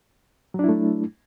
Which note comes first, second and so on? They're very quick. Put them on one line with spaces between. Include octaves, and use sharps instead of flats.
F#3 D4 E4 A3